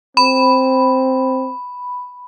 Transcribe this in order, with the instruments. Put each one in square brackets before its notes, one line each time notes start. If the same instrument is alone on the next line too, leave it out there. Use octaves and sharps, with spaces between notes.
[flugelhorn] C4 [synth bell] B5